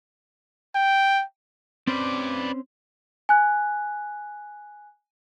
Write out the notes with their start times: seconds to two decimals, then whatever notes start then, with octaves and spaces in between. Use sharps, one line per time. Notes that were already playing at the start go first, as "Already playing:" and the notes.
0.75 G5
1.87 C4 C#4 B4 C5 D5
3.29 G#5 F#6